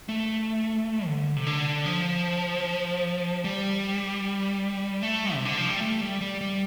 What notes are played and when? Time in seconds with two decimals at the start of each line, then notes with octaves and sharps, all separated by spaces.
0.09 A3
1.07 D3
1.36 C3
1.47 D3
1.86 F3
3.44 G3
5.03 A3
5.34 C3
5.45 D3
5.57 F3
5.69 G3
5.81 A3
6.01 G3
6.21 G3
6.41 G3